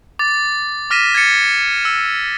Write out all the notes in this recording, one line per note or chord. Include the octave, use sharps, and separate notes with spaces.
D6 A6
D6 F6 A#6 B6 D#7 E7
G#6 A6 C#7
E6